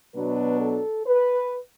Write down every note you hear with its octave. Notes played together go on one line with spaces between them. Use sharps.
B2 F#3 B3 D4 B4
A4
B4